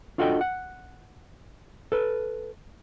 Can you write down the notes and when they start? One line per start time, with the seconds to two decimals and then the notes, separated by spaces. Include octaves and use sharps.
0.18 D4 F4 F#4 A4 D#5 G5
0.41 F#5
1.92 A4 B4